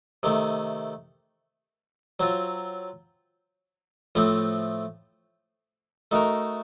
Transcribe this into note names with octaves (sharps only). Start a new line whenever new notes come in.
C3 D#3 A3
F#3 C4 F4
A2 F3 A3 C4
A3 D#4 F#4 A#4